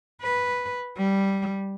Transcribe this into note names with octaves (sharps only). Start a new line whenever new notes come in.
B4
G3